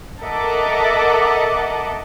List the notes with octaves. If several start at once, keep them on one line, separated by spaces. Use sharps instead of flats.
A4 A#4 D#5 E5 F#5 D6